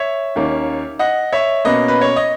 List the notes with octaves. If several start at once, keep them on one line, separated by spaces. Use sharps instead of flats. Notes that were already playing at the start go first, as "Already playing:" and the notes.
Already playing: C#5 E5
D#2 D#3 A#3 C#4
D#5 F#5
C#5 E5
B2 A#3 C#4 B4 D#5
B4
C#5
D#5